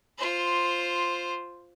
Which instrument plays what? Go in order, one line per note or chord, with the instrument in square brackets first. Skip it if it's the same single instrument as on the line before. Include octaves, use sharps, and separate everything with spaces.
[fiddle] F4 C5